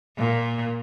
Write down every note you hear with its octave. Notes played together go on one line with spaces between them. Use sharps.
A#2